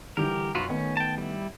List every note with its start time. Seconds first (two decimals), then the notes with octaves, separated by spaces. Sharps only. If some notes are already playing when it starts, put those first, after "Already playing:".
0.17 D3 E3 G3 G4 A#4
0.55 F#2 B3 F4 F#4
0.68 D#3 A3 B3 C#4
0.97 G5 A5
1.18 G3 E4